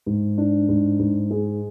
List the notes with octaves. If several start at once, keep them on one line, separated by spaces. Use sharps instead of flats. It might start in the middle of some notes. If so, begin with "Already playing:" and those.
G#2
D4
G#2
G#2
G#3